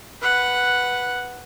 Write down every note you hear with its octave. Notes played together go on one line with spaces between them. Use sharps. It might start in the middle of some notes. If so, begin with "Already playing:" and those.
B4 F#5